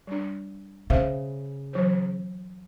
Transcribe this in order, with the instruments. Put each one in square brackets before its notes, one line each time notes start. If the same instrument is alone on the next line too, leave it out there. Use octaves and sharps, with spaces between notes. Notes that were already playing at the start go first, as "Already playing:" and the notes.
[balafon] G3 D4
[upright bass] C#3 [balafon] C5 E5 F5
[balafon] E3 F#3 C5